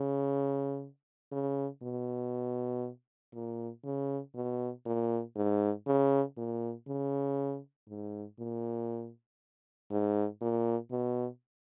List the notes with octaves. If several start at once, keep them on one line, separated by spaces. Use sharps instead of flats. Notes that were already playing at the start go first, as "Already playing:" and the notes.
Already playing: C#3
C#3
B2
A#2
C#3
B2
A#2
G#2
C#3
A#2
C#3
G#2
A#2
G#2
A#2
B2